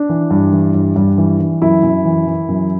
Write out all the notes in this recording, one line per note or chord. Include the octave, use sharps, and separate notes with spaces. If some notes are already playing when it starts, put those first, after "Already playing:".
Already playing: D4
E3
G2
E3
G2
G2
E3
E3
F#2 E4
F#2
E3
E3
F#2